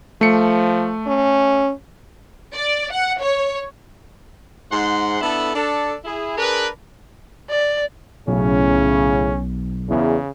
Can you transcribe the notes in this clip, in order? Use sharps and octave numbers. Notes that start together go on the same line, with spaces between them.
F3 A3 C#7
C#4
D5
F#5
C#5
G#2 F#5 C6
B3 D4 E4 A4
D4 A4
E4 G#4
D4 G#4 A#4 B4
D5
B1 A2 C#3 C#4
E2 C#3